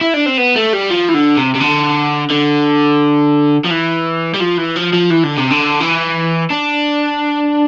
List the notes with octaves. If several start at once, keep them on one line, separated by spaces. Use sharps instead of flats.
E4
D4
C4
B3
A3
G3
F3
E3
D3
C3
C3
D3
D3
F3
E3
G3
F3
E3
F3
F3
E3
D3
C3
D3
E3
D4